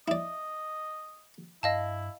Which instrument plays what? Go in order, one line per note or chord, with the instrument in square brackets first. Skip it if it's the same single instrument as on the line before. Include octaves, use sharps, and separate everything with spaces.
[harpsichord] E4 D5 [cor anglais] D#5
[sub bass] G2 [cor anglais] E4 [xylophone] D#5 F5 A5